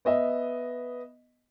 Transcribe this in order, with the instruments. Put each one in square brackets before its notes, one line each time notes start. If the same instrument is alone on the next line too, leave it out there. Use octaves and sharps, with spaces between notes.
[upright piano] B3 D#5 E5